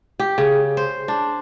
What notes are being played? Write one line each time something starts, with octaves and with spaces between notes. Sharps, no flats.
G4
C#3
C5
D4